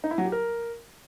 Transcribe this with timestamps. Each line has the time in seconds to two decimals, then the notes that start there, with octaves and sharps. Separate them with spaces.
0.04 D#4
0.11 E4
0.18 F#3
0.25 G4
0.32 A#4